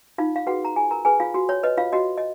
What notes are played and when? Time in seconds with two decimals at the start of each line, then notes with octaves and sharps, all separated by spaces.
0.18 D#4 F4 F5
0.36 F5
0.47 F#4 G#4 B4 F#5
0.65 A#5
0.76 F4 G#4 G#5
0.91 A#4 A#5
1.05 G#4 B4 G#5
1.20 F4 F5
1.34 F#4
1.49 C#5
1.63 B4 D#5
1.78 F4 F5
1.92 F#4 D#5
2.18 D#5